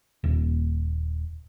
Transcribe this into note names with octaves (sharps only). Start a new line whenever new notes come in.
D#1